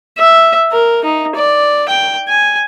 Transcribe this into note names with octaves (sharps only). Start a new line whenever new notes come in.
E5
A#4
D#4
D5
G5
G#5